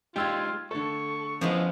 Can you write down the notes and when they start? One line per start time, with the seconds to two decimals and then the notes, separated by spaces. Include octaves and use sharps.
0.16 G#3 D#4 F4 G4 G5 E6 G#6
0.71 D3 A3 A4 C#6
1.41 F3 G#3 B3 C#4 E4 D#5